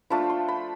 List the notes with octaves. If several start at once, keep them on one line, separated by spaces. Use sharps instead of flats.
F3 A3 D4 F4 B5
C6
B5